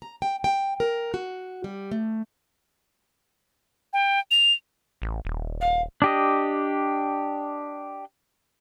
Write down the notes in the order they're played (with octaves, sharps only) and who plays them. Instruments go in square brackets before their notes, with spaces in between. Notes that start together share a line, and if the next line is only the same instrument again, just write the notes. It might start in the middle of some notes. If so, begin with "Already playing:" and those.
[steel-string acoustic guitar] A#5
G5
G5
A#4
F#4
G3
A3
[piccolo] G5
F7
[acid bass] A1
D#1
[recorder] F5
[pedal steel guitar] D4 G4 D#5